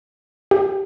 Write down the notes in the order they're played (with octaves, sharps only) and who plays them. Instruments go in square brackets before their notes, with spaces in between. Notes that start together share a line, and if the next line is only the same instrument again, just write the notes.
[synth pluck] G4